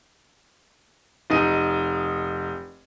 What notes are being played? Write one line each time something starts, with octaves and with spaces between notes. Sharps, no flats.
F1 D#4 D#5 D#7